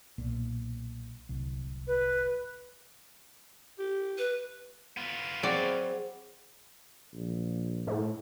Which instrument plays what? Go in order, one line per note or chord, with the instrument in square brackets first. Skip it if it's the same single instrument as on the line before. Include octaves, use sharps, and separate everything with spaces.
[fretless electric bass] B1 A#2
D1 C2
[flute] B4
[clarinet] G4
[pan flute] B4
[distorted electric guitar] B3 F4
[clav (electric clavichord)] F#3 C4 F#4 [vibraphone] G#4 C5 [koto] D5
[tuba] A#1
[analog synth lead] A2